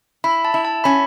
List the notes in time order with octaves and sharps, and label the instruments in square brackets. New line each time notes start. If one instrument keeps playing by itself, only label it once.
[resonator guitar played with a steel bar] E4 [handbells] B5
[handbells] A5
[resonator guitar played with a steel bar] E4
[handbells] A5
[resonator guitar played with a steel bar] C#4 [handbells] B5